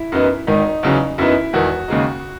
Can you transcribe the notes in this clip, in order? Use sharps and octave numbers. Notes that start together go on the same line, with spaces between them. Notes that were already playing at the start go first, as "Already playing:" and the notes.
Already playing: E4
F#2 E3 B3 D#4
G#1 G#2 D#3 D#4
E2 C#3 F#3
F#2 E3 B3 D#4 E4
E1 E2 D#3 F#4
D#2 C#3 G#3 D#4